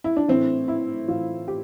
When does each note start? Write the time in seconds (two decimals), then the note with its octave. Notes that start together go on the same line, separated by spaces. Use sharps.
0.04 E4
0.17 D4
0.28 A2 E3 C4
0.68 E4
1.08 A2 E3 F4
1.48 G4